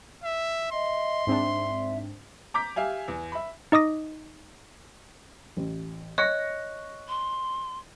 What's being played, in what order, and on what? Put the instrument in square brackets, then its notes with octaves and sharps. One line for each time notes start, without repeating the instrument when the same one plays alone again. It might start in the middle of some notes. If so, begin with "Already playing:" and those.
[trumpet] E5
[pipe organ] D#5 E5 [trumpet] C6
[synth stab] G#2 C4 D4 [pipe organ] E5
[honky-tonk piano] A#5 D6 G6 B6
G4 E5 F5 G#5
E2
E5 B5
[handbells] D#4 D#5 D6 D#6 A#6
[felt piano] A1
[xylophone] C#5 D#5 [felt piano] C#6 A#6 C#7 [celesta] F#6
[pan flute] C6